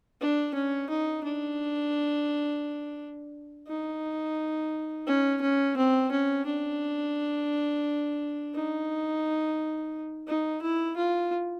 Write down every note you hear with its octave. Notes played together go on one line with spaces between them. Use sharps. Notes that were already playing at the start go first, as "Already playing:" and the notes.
D4
C#4
D#4
D4
D#4
C#4
C#4
C4
C#4
D4
D#4
D#4
E4
F4